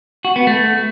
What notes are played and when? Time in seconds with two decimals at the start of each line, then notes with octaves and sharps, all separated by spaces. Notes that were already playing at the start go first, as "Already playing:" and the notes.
0.25 F#4
0.36 B3
0.47 A3